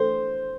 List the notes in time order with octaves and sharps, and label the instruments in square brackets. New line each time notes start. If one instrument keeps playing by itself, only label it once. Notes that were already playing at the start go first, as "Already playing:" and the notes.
Already playing: [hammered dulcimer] C5